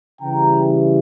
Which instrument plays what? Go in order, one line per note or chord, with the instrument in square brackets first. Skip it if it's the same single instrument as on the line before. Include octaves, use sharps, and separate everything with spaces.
[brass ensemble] C#3 E3 G3 G5 A#5